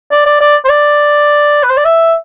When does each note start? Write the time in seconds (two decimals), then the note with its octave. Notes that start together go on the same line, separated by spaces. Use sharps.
0.12 D5
0.26 D5
0.41 D5
0.65 C5
0.69 D5
1.63 B4
1.70 C5
1.77 D5
1.85 E5